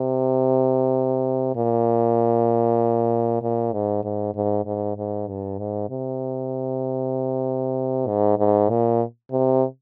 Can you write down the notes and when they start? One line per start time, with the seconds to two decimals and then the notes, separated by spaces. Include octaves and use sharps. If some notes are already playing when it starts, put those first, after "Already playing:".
Already playing: C3
1.55 A#2
3.42 A#2
3.73 G#2
4.04 G#2
4.35 G#2
4.65 G#2
4.97 G#2
5.28 G2
5.58 G#2
5.90 C3
8.07 G#2
8.38 G#2
8.70 A#2
9.31 C3